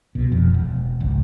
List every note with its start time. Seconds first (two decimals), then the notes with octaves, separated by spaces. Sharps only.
0.15 C2 B2
0.32 F1 F2
0.54 E1
1.00 G#1 C#2